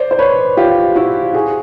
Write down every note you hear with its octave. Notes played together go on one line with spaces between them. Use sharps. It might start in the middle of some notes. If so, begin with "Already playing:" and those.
Already playing: C5 D5
C5
B4 C#5
F4 G4
E4 F#4
F#4 G#4